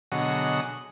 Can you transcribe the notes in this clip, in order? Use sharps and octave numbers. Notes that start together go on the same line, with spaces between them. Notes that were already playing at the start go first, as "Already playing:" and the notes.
B2 D3 F#3 G#4 D#5 F#5